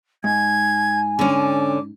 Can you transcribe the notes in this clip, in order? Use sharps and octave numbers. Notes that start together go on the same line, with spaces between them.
G#2 G#5 G#6
D3 C#4 D6